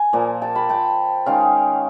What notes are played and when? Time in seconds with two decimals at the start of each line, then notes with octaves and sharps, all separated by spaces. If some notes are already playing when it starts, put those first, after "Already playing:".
Already playing: G#5
0.13 A#2 F3 A#3
0.42 G5 A5
0.55 A5 B5
0.69 G5 A5
1.26 D#3 G#3 C#4 F5 G5